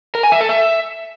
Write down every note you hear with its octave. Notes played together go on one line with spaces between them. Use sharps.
A#4
G#5
E5
A4
E5